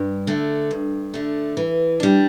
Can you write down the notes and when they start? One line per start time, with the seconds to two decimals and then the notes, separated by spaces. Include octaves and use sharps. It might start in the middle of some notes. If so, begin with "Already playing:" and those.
Already playing: G2
0.27 D3 A3
0.71 G2
1.14 D3 A3
1.57 E3
2.00 G3 D4